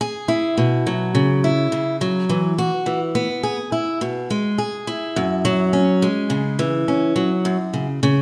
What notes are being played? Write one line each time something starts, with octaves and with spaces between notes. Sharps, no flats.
G#4
E4
B2
F#3
C#3
E4
C#3
F#3
E3
F#4
E3
B3
G#4
E4
B2
G#3
G#4
E4
F#2
F#3
C#4
G#3
C#3
E3
C#4
F#3
F#2
C#3
C#3